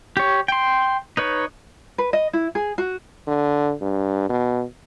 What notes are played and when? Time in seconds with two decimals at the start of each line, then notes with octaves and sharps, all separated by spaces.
0.17 G4 C#5
0.48 G5 C6
1.17 D#4 B4 C#5
1.98 B4
2.13 D#5
2.33 E4
2.55 G#4
2.78 F#4
3.28 D3
3.82 G2
4.30 B2